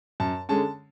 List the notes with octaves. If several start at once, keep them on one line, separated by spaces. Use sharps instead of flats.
F#2 A5
D3 G#3 C#4 A5